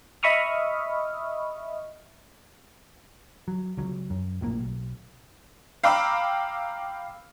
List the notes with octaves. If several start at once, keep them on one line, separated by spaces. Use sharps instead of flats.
D#5 E5 B5 C#6 D#6 F6
F#3
C#2 F#3
F#2
A#1 A2 D3 A#3
B1
F5 G5 A#5 B5 D6 E6